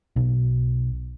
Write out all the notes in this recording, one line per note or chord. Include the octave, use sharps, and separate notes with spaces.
B1